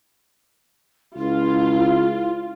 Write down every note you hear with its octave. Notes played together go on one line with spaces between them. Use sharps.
C#2 E4 F4